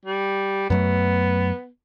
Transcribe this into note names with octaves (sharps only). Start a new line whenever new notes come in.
G3
F#2 F#3 A3 B3